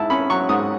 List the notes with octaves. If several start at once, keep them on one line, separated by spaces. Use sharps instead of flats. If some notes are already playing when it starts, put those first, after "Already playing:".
Already playing: G#2 E4 A5
C#4 B5
F#3 C#6
G#2 D#6